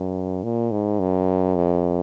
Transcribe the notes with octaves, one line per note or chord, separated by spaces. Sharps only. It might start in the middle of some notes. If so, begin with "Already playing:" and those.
Already playing: F#2
A#2
G#2
F#2
F2